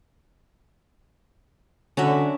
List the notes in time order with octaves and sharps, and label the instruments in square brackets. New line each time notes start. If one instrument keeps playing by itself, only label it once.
[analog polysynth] D3 F#3 F#4 [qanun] C#4 D4 E5